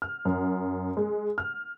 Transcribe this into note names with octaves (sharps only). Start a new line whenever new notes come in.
F6
F#2
G#3
F6